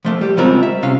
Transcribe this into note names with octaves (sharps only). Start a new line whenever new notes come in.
F3 A3 A#3
G3 G4
C#3 G3 G#3 C4 F4 A#4
E5
C3 C#4 F5